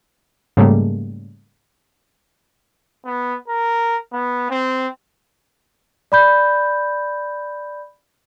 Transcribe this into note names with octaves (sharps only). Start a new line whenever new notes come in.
G#2 C#3 G3 A3 A#3
B3
A#4
B3
C4
D5 B5 G6